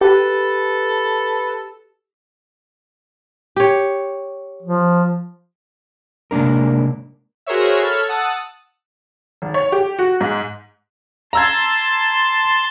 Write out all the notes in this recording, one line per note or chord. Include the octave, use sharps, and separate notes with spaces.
G4 A4 B4
G4 C#5
F3
C3 G#3 A#3 D4 A#4
F#4 G#4 A#4 C5 C#5 E5
A4 C#5 B5 F6
F#5 A5 D#6 E6 F#6
G#1
C#5
G4
F#4
G#2
A5 A#5 C6 E6 G#6